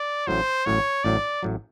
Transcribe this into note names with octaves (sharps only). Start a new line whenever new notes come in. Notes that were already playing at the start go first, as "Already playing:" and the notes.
Already playing: D5
A1 A2 F#3 C5
A1 A2 F#3 C#5
A1 A2 F#3 D5
A1 A2 F#3